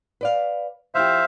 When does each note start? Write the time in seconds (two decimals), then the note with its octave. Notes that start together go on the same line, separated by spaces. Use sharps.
0.21 B4 D5 F5
0.95 F3 E4 G4 C5 E5 F5